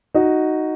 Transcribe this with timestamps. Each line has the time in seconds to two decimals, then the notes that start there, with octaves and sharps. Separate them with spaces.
0.15 D#4 F#4